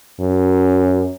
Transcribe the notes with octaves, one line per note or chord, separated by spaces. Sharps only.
F#2